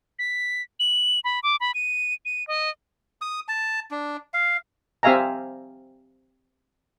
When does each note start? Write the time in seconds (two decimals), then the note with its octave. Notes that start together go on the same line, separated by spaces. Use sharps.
0.19 B6
0.80 F#7
1.24 B5
1.43 D6
1.61 B5
1.75 D#7
2.25 D#7
2.48 D#5
3.21 D#6
3.48 A5
3.91 D4
4.34 F5
5.03 C4 G4 E5 F5 G#5 A#5